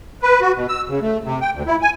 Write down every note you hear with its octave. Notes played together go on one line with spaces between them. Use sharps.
B4
F#4
B2
E6
C#3
A3
C3
G5
D2
E4
G#5